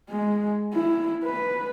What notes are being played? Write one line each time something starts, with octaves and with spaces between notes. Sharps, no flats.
G#3
E4
B4